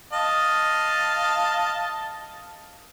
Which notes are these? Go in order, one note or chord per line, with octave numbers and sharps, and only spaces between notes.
D#5 F5 A5